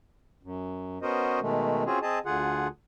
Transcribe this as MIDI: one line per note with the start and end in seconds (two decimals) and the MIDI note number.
0.43 0.98 42
1.02 1.40 59
1.02 1.40 61
1.02 1.40 66
1.02 1.40 70
1.02 1.40 72
1.02 1.40 75
1.41 1.84 47
1.41 1.84 51
1.41 1.84 56
1.41 1.84 57
1.86 1.99 60
1.86 1.99 61
1.86 1.99 65
1.86 1.99 66
1.86 1.99 68
2.02 2.19 60
2.02 2.19 68
2.02 2.19 75
2.02 2.19 81
2.25 2.67 38
2.25 2.67 50
2.25 2.67 65
2.25 2.67 68
2.25 2.67 78